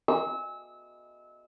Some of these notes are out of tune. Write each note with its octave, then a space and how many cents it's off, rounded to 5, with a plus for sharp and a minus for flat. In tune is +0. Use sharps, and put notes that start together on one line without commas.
E6 -25